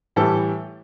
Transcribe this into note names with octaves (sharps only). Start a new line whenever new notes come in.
A2 E3 G3 A4